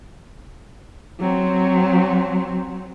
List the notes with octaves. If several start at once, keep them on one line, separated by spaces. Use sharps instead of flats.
F#3 C4